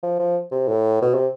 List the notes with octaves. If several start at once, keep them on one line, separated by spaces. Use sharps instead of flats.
F3
F3
C3
A2
B2
C3